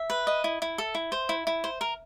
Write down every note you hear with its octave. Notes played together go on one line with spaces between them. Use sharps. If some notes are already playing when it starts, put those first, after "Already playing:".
Already playing: E5
B4
D#5
E4
E4
A4
E4
C5
E4
E4
C5
A#4